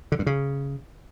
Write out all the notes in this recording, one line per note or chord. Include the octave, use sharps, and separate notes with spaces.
D3
G2
C#3